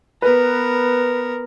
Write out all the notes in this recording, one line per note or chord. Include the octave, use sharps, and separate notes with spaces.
B3 A#4 B4